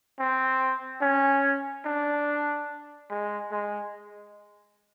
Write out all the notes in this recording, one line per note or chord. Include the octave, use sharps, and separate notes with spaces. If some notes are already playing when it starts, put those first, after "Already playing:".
C4
C#4
D4
G#3
G#3